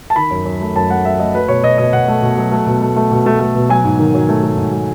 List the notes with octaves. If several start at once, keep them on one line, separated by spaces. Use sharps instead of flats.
A5
D#3 B5
F#2
F#2
A3
F#2 A5
A3 F#5
A3 E5
A3 D#5
F#3 B4
B2 C#5
B2 D#5
B2 D#5
B2 F#5
A3
B2
F#3
A3
B2
A3
A3
B2
A3
A3
B2
F#3 G#5
G#2
D#3
F#3
A3
A3
G#2
A3